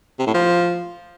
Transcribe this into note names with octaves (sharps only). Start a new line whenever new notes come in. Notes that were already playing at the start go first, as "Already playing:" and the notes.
C3
A2
F3